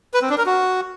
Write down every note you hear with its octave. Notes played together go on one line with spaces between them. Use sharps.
B4
C4
D4
A#4
F#4